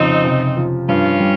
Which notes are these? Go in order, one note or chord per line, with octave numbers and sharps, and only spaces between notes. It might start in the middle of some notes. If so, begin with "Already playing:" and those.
Already playing: F2 C#3 F3 C4 D#4
C3
F3
G2 C#4 F4
G3